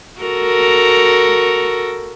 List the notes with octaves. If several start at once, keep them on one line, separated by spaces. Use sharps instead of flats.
F#4 A4 A#4